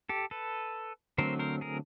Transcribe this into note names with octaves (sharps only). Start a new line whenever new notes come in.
G4 A4
A4 B4
D3 F#3 A3 C4 A#4 C5
A#4 C5
G#4 A#4